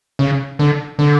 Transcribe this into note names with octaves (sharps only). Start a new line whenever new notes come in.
C#3
D3
D3